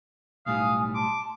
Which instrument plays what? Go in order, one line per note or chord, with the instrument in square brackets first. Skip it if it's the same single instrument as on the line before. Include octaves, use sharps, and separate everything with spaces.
[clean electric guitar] B1 A2 G3 [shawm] F5 [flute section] G#5 D#6
[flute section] A5 C6 [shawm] D6